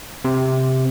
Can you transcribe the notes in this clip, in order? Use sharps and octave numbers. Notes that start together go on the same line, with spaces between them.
C3